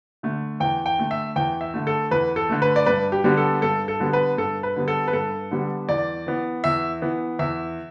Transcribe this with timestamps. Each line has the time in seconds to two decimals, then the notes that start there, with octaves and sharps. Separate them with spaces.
0.23 D3 A3
0.60 E2 G5
0.86 G5
0.99 D3 A3
1.11 E5
1.36 E2 G5
1.61 E5
1.74 D3 A3
1.87 A4
2.11 E2 B4
2.36 A4
2.49 D3 A3
2.62 B4
2.76 D5
2.86 G2 B4
3.12 G4
3.24 D3 G3 B3
3.37 A4
3.62 G2 A4
3.88 A4
4.00 D3 G3 B3
4.13 B4
4.38 G2 A4
4.63 B4
4.76 D3 G3 B3
4.88 A4
5.08 B4
5.13 G2 A4
5.51 D3 G3 B3
5.89 E2 D5
6.27 E3 B3
6.64 E2 E5
7.02 E3 B3
7.39 E2 E5